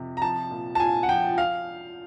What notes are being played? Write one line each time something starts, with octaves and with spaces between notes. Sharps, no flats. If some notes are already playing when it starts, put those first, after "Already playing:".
Already playing: F2 C3
A#5
F3 A5
A#2
A5
A#2 G#5
F#5
F3 G5
F5